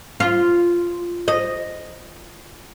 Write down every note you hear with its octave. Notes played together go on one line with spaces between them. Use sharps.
F4
D#5